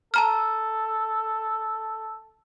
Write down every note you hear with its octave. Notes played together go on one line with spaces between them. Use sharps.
A4 A5 A#5 F6